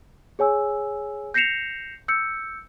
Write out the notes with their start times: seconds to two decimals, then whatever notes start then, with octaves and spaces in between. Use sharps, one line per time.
0.39 G#4 C#5 G#5 E6
1.34 G6 A#6 C7 C#7 E7 F7
2.08 E6 G6 C#7